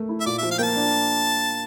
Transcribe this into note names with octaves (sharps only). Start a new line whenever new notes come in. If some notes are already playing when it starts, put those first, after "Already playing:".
Already playing: A3 A#4
E4
E5
A#2 D5
F3 E5
F5
A#3 G5 A5
D4